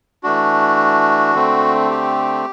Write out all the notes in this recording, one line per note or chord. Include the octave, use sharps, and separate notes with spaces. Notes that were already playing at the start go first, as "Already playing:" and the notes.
E3 A3 D4 F#4
D3 A3 C4
G4